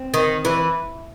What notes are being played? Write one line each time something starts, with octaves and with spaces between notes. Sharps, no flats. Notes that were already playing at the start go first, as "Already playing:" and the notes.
Already playing: C4
D#3
E3